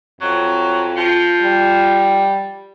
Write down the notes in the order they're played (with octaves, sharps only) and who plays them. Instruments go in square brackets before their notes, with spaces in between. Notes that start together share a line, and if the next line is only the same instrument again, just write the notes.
[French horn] F2 [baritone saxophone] F#3
[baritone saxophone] F3
[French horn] G3